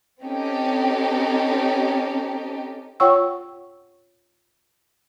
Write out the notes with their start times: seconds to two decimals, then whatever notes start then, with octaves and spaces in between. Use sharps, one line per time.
0.23 C4 C#4 D#4 G4 A4
3.00 F4 C#5 F#5 G5 C#6 E6